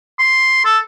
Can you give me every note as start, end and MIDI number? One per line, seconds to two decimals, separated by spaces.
0.19 0.60 84
0.65 0.78 69